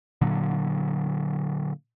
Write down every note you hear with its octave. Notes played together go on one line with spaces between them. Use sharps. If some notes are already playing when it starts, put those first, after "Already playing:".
A#2 D3 F#3